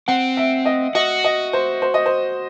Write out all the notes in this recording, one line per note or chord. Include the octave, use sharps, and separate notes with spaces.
C4 F#5
E5
D#5
F#4 D#5
D#5
C5
C5
D#5
C5